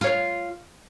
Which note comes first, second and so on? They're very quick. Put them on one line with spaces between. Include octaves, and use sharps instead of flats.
F4 C#5 F5